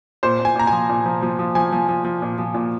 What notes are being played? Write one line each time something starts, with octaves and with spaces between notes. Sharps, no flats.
A#2 C5
A#2
G#5
A#2 A#5
F3 G#5
A#2
F3
F3
F3
F3 G#5
F3
F3
F3
A#2
F3
A#2